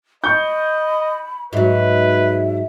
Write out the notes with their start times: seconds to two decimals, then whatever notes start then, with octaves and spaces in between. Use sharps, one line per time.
0.24 D#5 B5 C#6 G6
1.53 G#2 F#3 B4 E5